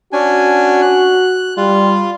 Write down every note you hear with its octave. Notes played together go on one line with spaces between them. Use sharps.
C#4 D4 F#4 G#5
F#6
G3 F4